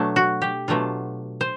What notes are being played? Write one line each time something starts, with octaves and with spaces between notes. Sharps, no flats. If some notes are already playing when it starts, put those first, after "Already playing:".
Already playing: B2 F#3 A3 D4
F#4
G4
B2 F#3 A3 D4 F4
C5